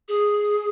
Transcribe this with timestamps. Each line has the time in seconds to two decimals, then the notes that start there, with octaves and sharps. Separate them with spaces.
0.08 G#4